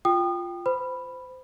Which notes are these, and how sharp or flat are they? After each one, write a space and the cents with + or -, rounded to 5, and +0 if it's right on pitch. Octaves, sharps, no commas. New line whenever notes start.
F4 +0 G5 +0 D#6 -30
C5 -25 B5 +0